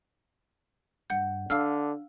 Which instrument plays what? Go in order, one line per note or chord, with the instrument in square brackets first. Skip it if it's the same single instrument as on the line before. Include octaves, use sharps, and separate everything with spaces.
[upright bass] G2 [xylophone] F#5 G6
[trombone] D3 [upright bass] D4 [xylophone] F5 E6 F6